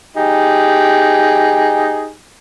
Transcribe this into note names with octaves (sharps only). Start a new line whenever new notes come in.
D#4 G4 G#4